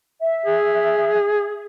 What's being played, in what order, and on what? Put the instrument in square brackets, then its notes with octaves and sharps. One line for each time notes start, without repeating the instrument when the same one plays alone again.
[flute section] E5
[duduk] G#4